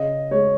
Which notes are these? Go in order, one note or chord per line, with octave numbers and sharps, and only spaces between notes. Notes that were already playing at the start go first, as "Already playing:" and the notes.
Already playing: C#3 D#5
G#3 C#5